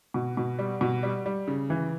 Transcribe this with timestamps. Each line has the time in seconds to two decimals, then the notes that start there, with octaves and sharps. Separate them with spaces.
0.14 B2
0.37 B2
0.59 G3
0.81 B2
1.03 G3
1.26 G3
1.48 C#3
1.70 E3